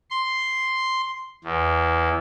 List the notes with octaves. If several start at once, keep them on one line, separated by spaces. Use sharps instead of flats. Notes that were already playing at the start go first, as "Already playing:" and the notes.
C6
E2